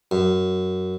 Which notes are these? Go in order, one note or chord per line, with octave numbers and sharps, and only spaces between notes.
F#2